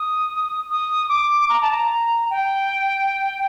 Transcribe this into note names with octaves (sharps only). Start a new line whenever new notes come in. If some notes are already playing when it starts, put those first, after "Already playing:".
Already playing: D#6
D#6
D6
A#5
A5
A#5
G5